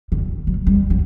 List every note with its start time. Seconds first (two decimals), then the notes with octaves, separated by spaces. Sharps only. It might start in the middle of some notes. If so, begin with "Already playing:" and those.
0.12 D3
0.47 F#3
0.67 G3
0.90 F#3